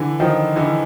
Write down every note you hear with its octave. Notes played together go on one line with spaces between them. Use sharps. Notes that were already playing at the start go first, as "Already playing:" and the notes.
Already playing: D3 E3
D#3 F3
D3 E3